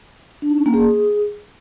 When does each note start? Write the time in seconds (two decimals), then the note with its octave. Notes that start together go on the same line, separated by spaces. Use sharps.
0.42 D4
0.50 D#4
0.58 C#4
0.66 A#3
0.74 G#4